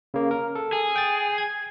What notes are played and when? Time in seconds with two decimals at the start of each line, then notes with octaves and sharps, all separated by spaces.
0.14 C#3 A#3
0.31 A#4
0.55 A4
0.73 G#4
0.96 G5 A6
1.38 G#6